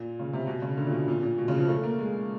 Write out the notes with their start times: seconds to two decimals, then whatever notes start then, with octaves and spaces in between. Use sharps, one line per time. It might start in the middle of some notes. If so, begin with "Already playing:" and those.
Already playing: A#2
0.19 C#3
0.33 C3
0.47 B2
0.62 C#3
0.77 D3
0.86 A#2
0.92 B2
1.08 A#2
1.23 A#2
1.38 B2
1.48 C#3
1.58 F3
1.69 A3
1.83 A#3
1.99 G#3